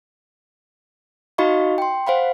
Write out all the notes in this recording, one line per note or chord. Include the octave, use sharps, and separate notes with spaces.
D#4 F#4 D#5 F5 B5 C#6
G5 C6
C5 F5 F#5 B5